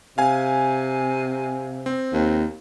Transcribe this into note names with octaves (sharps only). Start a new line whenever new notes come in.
C3 F5 G#5
C4
D#2